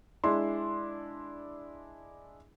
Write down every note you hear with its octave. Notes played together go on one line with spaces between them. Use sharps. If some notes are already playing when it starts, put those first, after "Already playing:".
G#3 D4 E4 C6